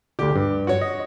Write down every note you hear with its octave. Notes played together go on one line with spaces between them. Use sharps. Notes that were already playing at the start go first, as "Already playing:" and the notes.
D2 D3 G4
G2
F#4 C#5
D#5